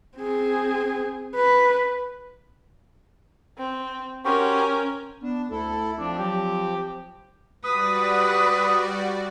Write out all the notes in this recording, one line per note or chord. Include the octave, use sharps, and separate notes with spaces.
C4 G#4
B4
C4
C#4 F#4 G4 A#4 C5
B3 D4
D2 E4 A4
F3 C4 D4
F#3 G4
G3 F#4 B4 D5 D#6